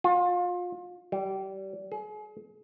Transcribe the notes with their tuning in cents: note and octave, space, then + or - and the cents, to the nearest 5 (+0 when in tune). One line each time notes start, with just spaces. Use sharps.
F4 +30
G3 -25
G#4 +35